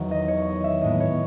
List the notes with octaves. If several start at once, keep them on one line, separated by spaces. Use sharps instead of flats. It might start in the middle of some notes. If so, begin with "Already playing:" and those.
Already playing: E2 D#3 F#3
D#5
C#5
D#5
E5
A2 G#3 B3 D#5
C#5